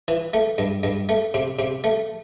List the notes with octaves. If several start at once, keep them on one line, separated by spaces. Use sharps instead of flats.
E3
A3
G2
G2
A3
C3
C3
A3